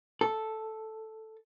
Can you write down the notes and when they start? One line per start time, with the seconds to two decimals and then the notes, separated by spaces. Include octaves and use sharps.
0.21 A4